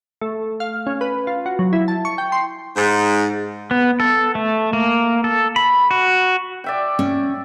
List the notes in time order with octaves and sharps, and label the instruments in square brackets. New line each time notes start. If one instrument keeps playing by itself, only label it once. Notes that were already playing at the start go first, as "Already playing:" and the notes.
[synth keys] A3
F5
C#4
B4
F4
F#4
F#3
E4
A5
C#6
G5
C6
[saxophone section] G#2
[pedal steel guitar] B3
A4
A3
A#3
A4
B5
F#4
[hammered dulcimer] D5 E5 G5
[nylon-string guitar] C#4